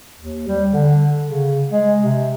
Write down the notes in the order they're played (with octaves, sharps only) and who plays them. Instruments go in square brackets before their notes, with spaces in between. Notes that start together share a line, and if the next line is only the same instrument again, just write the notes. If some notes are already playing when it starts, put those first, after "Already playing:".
[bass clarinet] D#2
G3
D3
C#3
G#3
C3